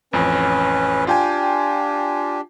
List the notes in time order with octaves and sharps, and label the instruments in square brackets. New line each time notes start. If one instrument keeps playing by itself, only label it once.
[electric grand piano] A1 F2 [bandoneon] C#4 B4
[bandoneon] D4 G4 [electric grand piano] F4 G5 G#5